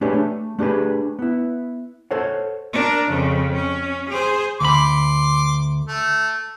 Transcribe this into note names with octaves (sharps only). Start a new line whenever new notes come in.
A3 D4 G4 G#4 B4 C#5
A3
A3 D4 G4 G#4 B4
B3 E4
A4 C5 C#5 F#5
D4 A#4
F2 C#3
C#4
G#4 C5
D2 B5 C6 D6
A3